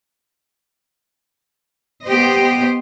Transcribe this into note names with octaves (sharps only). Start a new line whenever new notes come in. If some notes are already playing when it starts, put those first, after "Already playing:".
B3 G4 C5 D#5